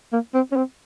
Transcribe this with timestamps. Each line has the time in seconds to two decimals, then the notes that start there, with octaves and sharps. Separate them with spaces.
0.13 A#3
0.34 C4
0.52 C#4
0.56 C4